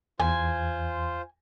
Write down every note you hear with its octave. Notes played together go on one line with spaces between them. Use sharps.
E2 F4 C5 G#5